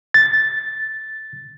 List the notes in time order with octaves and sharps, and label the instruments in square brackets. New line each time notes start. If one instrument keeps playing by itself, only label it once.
[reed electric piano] A6